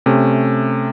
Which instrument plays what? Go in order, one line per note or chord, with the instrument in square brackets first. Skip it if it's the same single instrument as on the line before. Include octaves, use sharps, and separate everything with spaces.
[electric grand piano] C3 A3 C#4